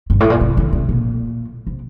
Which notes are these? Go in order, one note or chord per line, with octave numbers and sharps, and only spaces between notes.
G2
A2
A#2
C3
D3
C3
A#2
C3